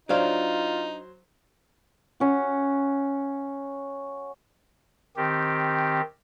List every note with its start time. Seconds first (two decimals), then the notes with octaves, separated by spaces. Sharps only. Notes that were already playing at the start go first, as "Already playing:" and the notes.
0.09 F#3 D4 D#4 F4 C5 F5
2.20 C#4 F#4
5.17 D#3 C4 G4